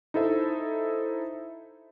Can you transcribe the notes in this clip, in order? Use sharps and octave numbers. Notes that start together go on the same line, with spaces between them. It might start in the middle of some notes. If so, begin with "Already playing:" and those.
D#4 E4 A4 C5 E5